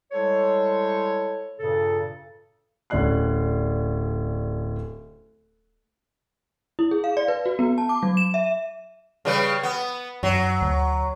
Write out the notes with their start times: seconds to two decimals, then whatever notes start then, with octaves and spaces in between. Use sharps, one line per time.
0.12 G3 G#3 E4 A4 C5 C#5
1.59 G2 A#2 C#3 A4
2.90 D1 C#4 D5 F#6 C7
6.79 E4
6.91 G#4
7.04 F5
7.17 D5
7.28 B4
7.46 F#4
7.59 B3
7.78 A5
7.89 D6
8.03 F#3
8.17 E7
8.34 E5
9.25 C#3 G3 B4
9.63 B3
10.23 F#2 F#3
10.62 D2